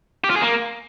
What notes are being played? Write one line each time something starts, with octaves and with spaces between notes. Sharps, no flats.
G4
F4
G#4
A#3